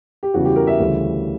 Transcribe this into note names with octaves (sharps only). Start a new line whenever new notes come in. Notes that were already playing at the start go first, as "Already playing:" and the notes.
G4
E2 C#3 E3 G3 F#4
G4
A#4
E5
D2 C#3 E3 G3